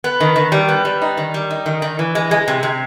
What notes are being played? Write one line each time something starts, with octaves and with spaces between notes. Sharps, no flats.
B3
D#3
D#3
G3
B3
G3
D#4
D#3
G3
D#4
D#3
D#3
E3
G#3
G#3
C3
C3